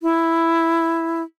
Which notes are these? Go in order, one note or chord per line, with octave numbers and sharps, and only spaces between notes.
E4